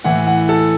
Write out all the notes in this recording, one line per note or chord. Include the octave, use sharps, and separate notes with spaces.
A2 E3 F#5
F#5
A4